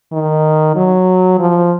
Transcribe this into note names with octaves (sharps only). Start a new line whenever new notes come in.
D#3
F#3
F3